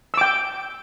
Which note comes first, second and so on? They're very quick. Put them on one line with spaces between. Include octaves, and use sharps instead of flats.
E6 D6 G5